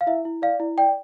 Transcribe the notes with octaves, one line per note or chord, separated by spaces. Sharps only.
F5
E4 E5
E4
D5 F5
E4
D5 G5